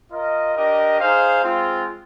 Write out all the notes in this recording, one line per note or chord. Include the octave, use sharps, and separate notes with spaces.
F4 A#4 D#5
D4 G4 A#4 D#5
D#4 G#4 C5 F5
G#3 C4 F4